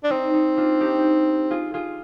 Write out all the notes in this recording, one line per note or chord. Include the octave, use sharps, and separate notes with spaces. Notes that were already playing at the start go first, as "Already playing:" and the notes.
D4
C4 D#4
D#4
D4 F4
D#4 G4
F4 G#4
F4 G#4